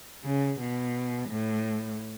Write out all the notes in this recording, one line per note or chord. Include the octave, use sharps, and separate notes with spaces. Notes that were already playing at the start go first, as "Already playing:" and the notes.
C#3
B2
A2